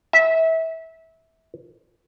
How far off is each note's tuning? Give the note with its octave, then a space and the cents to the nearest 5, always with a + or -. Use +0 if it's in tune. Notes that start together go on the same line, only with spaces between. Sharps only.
E5 -25